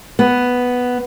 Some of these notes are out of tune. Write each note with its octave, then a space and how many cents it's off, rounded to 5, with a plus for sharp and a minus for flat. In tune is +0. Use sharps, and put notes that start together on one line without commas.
B3 +0